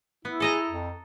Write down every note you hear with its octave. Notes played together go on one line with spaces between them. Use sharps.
B3 E4
G#4 A4 D#5 A#5
F2